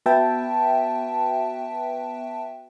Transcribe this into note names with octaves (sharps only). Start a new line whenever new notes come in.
B3 F#4 B4 E5 G5 A5